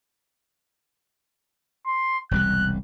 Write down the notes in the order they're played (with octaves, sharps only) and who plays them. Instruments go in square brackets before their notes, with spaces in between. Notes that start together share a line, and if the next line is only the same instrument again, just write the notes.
[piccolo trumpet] C6
[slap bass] E1 C2 G3 [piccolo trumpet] F#6